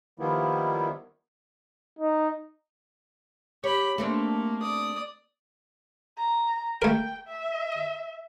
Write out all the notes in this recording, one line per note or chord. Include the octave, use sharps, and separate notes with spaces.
D#3 F3 G3 A#3 B3 E4
D#4
G4 C#5 B5
A3 A#3 C4 D4
D5 D#6
A#5
A3 A#4 G5
E5